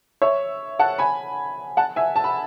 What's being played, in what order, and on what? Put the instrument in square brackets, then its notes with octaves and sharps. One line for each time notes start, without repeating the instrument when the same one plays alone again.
[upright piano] C#5 E5
F#5 A5
G#5 B5
F#5 A5
E5 G#5
A5
B5